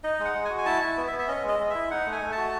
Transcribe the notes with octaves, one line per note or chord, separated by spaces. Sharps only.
D#4 D#5
G#3
F#5
G#3
G#5
F#4
G#5
E4 A5
E4
B3
E5
B3
E5
C#4 D#5
G#3
D#5
G#3
E4 E5
D#4 F#5
A3
G#5
A3
A5
F#4